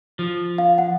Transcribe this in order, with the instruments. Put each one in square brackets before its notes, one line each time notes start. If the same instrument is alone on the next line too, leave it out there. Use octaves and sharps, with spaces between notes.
[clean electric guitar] F3
[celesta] F5
F#5